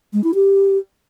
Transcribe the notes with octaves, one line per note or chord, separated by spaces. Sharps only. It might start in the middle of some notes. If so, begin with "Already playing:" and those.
G#3
E4
G4